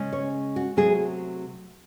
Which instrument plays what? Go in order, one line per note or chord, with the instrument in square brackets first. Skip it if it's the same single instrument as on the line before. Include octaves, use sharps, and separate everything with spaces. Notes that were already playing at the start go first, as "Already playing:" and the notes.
Already playing: [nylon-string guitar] C#3 G#3 C#4
C#5
F#4
C3 F#3 A3 G#4